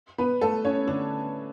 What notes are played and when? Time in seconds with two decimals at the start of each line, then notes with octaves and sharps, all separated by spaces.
0.18 B3 B4
0.41 A3 A4
0.64 C#4 C#5
0.87 D3 D4